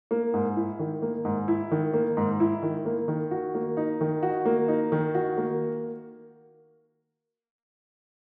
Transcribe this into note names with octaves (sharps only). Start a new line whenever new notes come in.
A#3
G#2
E4
D#3
A#3
G#2
E4
D#3
A#3
G#2
E4
D#3
A#3
D#3
F#4
A#3
D#4
D#3
F#4
A#3
D#4
D#3
F#4
A#3